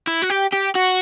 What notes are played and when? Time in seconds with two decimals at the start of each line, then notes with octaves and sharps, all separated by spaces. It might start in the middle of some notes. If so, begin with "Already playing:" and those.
0.07 E4
0.22 F#4
0.30 G4
0.53 G4
0.75 F#4